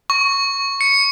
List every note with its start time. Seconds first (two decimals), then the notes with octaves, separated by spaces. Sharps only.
0.10 C#6
0.81 C#7